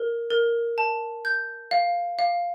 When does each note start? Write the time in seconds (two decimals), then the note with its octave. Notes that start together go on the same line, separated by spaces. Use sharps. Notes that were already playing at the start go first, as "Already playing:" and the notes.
Already playing: A#4
0.30 A#4
0.78 A5
1.25 G6
1.71 F5
2.19 F5